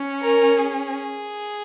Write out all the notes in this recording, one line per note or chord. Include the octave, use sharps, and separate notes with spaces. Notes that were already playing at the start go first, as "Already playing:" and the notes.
Already playing: C#4
A#4
G#4